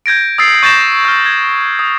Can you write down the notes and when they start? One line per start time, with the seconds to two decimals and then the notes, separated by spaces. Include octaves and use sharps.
0.06 G6 G#6 A#6 D7
0.38 D#6 E6 A6 C7
0.63 C#6 G6 A6 A#6 E7
1.05 E6 F6
1.26 G#6
1.79 D#6